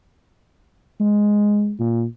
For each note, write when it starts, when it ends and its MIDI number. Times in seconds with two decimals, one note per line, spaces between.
1.00 1.74 56
1.80 2.04 46